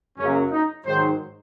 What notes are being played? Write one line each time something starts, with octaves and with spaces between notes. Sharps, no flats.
F#2 C#3 F#3 A#3 C#4
D#4
G#2 D#3 F#3 C5